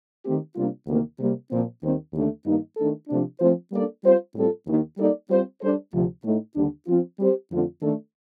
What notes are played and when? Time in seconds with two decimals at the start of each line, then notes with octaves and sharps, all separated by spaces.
0.25 D#3 A3 C4 G4
0.56 C3 G3 A#3 D4 F4
0.87 D2 C3 D#3 A#3
1.19 C3 G3 A#3
1.50 A#2 F3 C4
1.82 D#2 D#3 G3 C4
2.13 D#2 D3 A3 D4
2.44 G2 D#3 A#3 D#4
2.76 D#3 A3 D4 A4
3.08 C3 F3 A3 D4
3.39 F3 A3 C4 F4 C5
3.71 G3 A#3 D4 A4 D5
4.03 G3 C4 F4 C5
4.34 A2 G3 C4 F4 A4
4.67 D#2 D#3 A#3
4.97 G3 A#3 D#4 A4 D5
5.29 G3 C4 F4 C5
5.61 G3 D4 A4 C5
5.92 D2 C3 F3
6.24 A2 A3 D#4
6.55 D#2 D3 G3 D4
6.86 F3 C4 F4
7.18 G3 C4 G4 C5
7.51 F2 D3 A3 C4 F4
7.81 D#3 A3 D4 A4